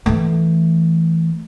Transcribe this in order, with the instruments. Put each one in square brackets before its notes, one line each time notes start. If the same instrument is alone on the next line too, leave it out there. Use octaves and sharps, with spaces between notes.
[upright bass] E3 A3